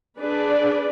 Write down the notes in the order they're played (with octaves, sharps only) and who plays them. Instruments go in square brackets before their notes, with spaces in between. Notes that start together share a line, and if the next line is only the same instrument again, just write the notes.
[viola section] D4 G#4 B4 D5